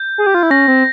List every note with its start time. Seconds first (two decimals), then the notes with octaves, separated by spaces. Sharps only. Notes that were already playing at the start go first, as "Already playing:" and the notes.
Already playing: G6
0.18 G#4
0.26 G4
0.34 F4
0.43 E4
0.51 C#4 A#6
0.68 C4